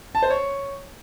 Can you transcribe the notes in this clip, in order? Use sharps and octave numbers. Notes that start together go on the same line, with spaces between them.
A5
C5
C#5